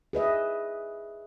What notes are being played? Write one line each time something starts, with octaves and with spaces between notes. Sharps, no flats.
G#4 B4 D#5 E5